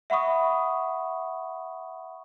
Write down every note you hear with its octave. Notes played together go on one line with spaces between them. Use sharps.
E5 F#5 B5 C#6 D#6